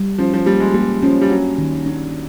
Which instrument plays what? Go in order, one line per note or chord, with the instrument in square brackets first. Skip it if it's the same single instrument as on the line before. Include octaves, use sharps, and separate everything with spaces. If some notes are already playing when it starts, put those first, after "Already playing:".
Already playing: [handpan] G3
[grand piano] F3 [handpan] C#4
[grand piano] F3
[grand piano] G3 [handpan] A#3
[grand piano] G#3
[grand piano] G3 [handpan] A#3
[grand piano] F3 [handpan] C#4
[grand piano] G3
[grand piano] F#3 [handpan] D4
[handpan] D#3
D4